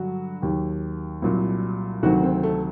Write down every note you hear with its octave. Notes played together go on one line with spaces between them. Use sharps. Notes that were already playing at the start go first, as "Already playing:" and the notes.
Already playing: G2 D3 F#3 F#4
D#2 D#3 F#3 G4
C2 A#2 F#3
D2 C3 D#3 F#3 F#4
C4
A3